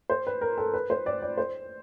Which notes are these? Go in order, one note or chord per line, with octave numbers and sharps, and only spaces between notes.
C5
B4
A#4
A4
B4
C5
D5
D5
C5